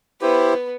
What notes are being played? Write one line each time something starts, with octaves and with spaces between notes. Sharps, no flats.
B3 E4 G4 B4 C5